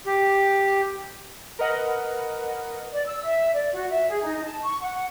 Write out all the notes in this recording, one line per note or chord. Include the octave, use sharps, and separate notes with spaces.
G4
A#4 B4 D#5 F#5
D5
E6
E5
D5
F#4
E5
G#4
D#4
A5
C#6
F#5